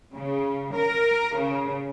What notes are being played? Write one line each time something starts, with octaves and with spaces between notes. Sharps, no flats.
C#3
A#4
C#3